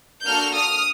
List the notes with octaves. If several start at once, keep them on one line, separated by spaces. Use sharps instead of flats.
A#3 D4 F#4 A4 F6 G6
D#6 F6